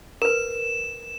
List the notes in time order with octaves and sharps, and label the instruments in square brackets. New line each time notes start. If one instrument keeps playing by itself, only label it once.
[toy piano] A#4 B4 [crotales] E7